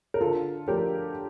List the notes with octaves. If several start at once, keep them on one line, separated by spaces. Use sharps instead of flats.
A#4
D3 F4 A4
F3 A3 D4 G4 A#4